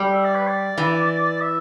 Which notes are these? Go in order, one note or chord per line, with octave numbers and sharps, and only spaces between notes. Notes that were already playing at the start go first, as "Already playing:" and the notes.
Already playing: G3
E5
D5
B4
D5
E3
E5